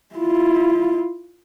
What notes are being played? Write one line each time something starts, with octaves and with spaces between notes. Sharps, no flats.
E4 F4